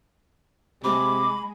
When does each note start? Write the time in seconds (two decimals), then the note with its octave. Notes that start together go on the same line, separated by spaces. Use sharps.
0.84 C3 G#3 B5 D6